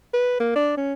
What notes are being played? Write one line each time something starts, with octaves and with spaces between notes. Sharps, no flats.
B4
A#3
D4
C#4